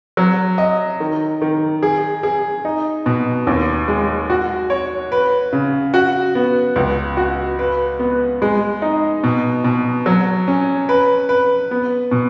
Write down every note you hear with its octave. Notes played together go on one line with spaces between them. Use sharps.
F#3
D#5
D#3
D#3
G#4
G#4
D#4
B2
D#2
G#3
F#4
C#5
B4
C#3
F#4
B3
C#2
F#4
B4
B3
G#3
D#4
B2
B2
F#3
C#4
B4
B4
B3
B2